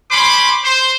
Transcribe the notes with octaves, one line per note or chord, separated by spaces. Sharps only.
C#4 C5 B5 C6 D6
C5